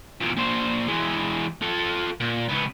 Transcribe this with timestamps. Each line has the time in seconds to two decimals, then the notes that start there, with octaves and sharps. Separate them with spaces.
0.21 E2 A#2
0.37 A#2 C5
0.88 E3 G#3
1.62 F4 A4
2.20 A#2
2.49 C#2 B3